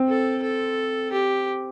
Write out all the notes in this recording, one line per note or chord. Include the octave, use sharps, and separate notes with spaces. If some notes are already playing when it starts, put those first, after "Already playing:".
Already playing: C4
A4
A4
G4